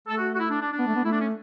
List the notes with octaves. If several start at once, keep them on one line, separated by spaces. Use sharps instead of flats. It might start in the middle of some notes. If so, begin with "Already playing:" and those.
A3 A4
F#4
F#4
E4
D4
D4
D4
B3
A3
B3
A3 E4
D4
C#4